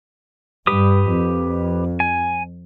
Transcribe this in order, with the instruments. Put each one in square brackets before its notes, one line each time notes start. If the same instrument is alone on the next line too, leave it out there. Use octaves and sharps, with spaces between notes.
[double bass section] G2 [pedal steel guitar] G4 B4 D#6
[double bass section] F2
[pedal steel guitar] G#5